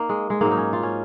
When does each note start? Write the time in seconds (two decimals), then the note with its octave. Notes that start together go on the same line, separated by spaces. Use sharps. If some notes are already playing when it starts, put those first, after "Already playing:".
Already playing: A#3 D#4
0.09 G#3
0.30 G#3
0.41 G#2 F#3 A#3
0.51 D#4
0.57 C#4
0.73 F4
0.83 C#4